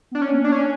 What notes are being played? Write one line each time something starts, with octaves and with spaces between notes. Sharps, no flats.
B3 D4
C#4
A#3
D4
C#4